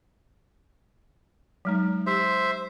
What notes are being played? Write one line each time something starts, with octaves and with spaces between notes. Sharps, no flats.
F#3 G#3 D#4
G4 C5 E5